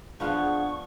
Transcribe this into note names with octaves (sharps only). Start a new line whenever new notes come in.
F3 B3 D4 G#4 F5 F#5 C#6